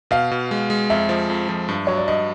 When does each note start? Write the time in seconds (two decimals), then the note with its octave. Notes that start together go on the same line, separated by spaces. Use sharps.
0.11 B2 F5
0.31 B2
0.51 G#3
0.70 G#3
0.90 F2 E5
1.09 F3
1.30 F2
1.49 F3
1.68 G2
1.87 F#3 C#5
1.97 D5
2.08 G2 D#5